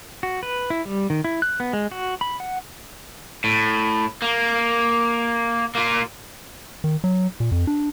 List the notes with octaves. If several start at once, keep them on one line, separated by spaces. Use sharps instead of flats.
F#4
B4
E4
G3
D#3
E4
F#6
B3
G#3
F#4
B5
F#5
A2
A#3
A#3 F4
D#3
F#3
A#2
F2
D4